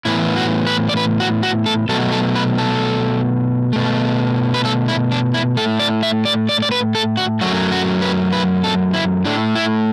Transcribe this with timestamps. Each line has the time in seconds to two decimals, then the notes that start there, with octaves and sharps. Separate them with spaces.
0.05 A2 E3 B3 E4
0.36 F#4
0.67 B4
0.89 D5
0.97 B4
1.20 F#4
1.43 F#4
1.66 A4
1.89 B2 F#3 A3 A4
2.12 A4
2.36 B4
2.58 A4
3.73 B2 A3
4.54 B4
4.65 A4
4.88 E4
5.12 D4
5.34 E4
5.57 A2 A4
5.61 A3
5.79 D5
6.03 E5
6.25 D5
6.49 D5
6.62 D5
6.72 B4
6.95 A4
7.17 F#4
7.41 F#2 F#3 A3 F#4
7.72 F#4
8.02 B4
8.32 B4
8.64 A4
8.94 E4
9.25 A2 A3 D4
9.55 E4